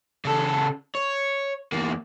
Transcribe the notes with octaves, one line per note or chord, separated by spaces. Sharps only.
C#3 A4
C#5
E2 A#3